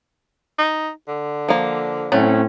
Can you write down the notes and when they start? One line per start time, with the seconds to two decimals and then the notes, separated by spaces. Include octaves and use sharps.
0.59 D#4
1.08 D3
1.49 F3 A#3
2.12 A2 F#3 A3 C4 C#4